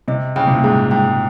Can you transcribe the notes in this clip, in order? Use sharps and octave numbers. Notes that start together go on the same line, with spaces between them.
C3 D#5
C#3 G5
C3
A#2
G#2 G#4
G#2 G5